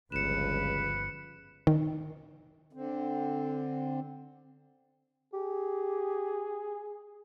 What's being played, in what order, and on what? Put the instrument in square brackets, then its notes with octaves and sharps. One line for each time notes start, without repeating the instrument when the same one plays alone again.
[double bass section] G1 F3 [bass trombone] C#2 [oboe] B4 [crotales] C#7 E7
[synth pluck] D#3
[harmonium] D3 C4
[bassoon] G4 [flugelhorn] G#4